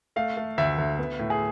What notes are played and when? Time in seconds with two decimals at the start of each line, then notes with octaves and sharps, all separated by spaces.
0.16 A3 F5
0.37 A3
0.58 D2 E5
0.78 D2
0.99 B3
1.19 A2
1.30 G#4